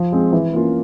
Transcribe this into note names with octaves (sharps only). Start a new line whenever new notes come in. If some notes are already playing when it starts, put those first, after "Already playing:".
Already playing: F3
G#3 C4
E3
A#3 C#4 F4